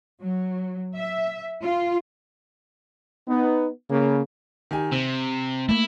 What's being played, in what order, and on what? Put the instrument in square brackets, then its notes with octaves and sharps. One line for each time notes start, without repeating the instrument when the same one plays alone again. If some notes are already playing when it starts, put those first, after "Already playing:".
[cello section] F#3
E5
F4
[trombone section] B3 D#4
C#3 A#3
[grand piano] D#3 G4 G#5
[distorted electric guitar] C3 [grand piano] C4
[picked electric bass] A3 A#3 [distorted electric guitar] E4